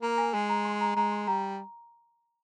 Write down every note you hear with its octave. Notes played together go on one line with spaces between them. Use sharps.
A#3 A#5
G#5
G#3 G#5
A#5
C6
A#5
G#3 A#5
C6
G3 A#5